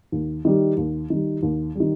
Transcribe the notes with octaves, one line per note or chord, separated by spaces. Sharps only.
D#2
D#3 G3
D#2
D#3 G3
D#2
D#3 G3